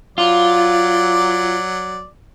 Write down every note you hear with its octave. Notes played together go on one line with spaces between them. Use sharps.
F#3 F4 D5